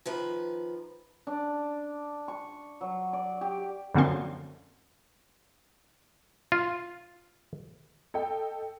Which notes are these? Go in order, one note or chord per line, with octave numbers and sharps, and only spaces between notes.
D#3 F3 B4
D4
C#6
F#3
D5
G4
F#2 D3 F3 A#3 C4 C6
F4
A4 D#5 G5